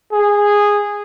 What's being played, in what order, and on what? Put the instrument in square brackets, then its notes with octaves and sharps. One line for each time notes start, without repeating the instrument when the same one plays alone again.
[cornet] G#4